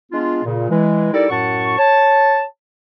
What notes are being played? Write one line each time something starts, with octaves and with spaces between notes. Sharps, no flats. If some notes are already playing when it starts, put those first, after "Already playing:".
G#3 B3 D4 F4
A#2 C#3
E3 G#3
G3 D#4 E4 A4 A#4 D5
F#2 A2 F#5 A5 C#6
C#5 A5